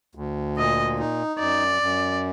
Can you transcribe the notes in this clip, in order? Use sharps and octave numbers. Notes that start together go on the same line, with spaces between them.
D2
A#2 D#5
D#4
F#2 D5
F#2